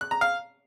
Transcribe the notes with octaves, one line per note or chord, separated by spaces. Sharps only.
F#6
A#5
F5